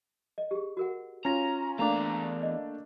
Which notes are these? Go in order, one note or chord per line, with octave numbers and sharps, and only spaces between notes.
D#5
G4 G#4
F#4 A#4 F#5
C#4 F4 A#5 A#6
E2 A3 A#3 D4 F5 G#5 A#5 D6
D#5